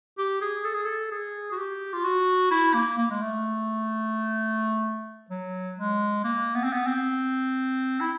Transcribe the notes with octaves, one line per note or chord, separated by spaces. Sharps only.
G4
G#4
A4
G#4
A4
G#4
F#4
G4
F4
F#4
E4
A#3
A#3
G#3
A3
F#3
G#3
A#3
B3
C4
B3
C4
E4